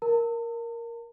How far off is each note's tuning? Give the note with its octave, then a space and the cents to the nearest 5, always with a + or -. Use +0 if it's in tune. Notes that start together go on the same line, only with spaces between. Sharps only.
A#4 +0 A5 +45